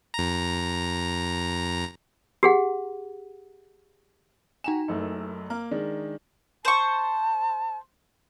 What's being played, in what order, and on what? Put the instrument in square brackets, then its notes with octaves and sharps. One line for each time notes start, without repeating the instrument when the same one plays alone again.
[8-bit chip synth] F2 A#5
[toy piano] G4 G#4 F#5
[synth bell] D#4 G5 G#5 [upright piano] F#4 A#5 E7
[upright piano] F#1 F#2 A3
[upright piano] A#3 [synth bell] A#5 F6
[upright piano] D#3 G#3 D4
[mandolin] C5 C#6 [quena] A5